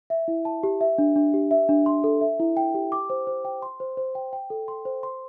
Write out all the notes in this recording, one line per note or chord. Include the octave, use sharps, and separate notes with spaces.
E5
E4
A5
G4
E5
D4
D4
G4
E5
D4
C6
A4
E5
E4
G5
G4
D6
C5
C5
G5
C6
C5
C5
G5
G5
A4
C6
C5
C6